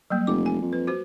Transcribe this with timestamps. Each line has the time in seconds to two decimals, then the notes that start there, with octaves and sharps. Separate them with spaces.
0.10 F#3 G3 A#3
0.27 F1 D6
0.46 G#5
0.61 F2
0.73 B4
0.87 F#4 C5